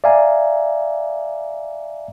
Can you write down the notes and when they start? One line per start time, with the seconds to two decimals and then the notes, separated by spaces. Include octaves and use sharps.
0.04 D5 E5 F5 G#5 A#5